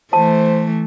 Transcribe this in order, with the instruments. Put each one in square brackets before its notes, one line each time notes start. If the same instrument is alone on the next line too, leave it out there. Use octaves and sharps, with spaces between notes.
[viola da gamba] E3 A3 [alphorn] C5 [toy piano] A5